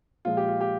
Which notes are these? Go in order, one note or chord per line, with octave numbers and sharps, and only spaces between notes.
A#2 F3 G#3 F4
G4
F4
G4